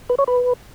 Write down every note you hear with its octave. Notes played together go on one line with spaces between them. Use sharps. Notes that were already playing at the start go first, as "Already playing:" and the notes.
B4
C#5
B4